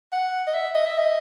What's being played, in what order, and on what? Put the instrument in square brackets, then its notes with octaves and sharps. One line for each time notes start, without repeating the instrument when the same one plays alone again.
[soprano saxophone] F#5
D#5
E5
D#5
E5
D#5